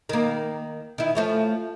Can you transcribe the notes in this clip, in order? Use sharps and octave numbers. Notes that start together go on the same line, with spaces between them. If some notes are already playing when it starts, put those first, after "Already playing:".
D#3 A#3
D#3 E4
F3 A3 C#4